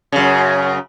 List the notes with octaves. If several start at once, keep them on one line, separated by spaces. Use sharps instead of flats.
F#2 C#3